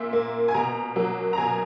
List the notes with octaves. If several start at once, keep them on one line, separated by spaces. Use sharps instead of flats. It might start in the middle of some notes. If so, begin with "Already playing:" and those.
Already playing: A#2 A#3 E5
A#3
G#5
B2 A#5
F#3 A#3
A#5
B2 G#5